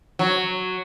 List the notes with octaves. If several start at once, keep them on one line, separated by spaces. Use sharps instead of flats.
F#3